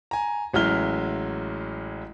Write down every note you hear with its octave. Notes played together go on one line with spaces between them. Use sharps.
G#5 A#5
A1 F#3 G#3 E4 F6 G7